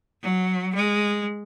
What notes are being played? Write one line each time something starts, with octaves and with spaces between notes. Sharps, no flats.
F#3
G#3